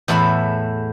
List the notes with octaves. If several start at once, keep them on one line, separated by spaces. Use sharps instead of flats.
E2 A2 A4 E5 B5